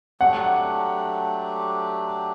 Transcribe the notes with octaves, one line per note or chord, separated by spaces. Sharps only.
F#3 A3 D4 G4 F#5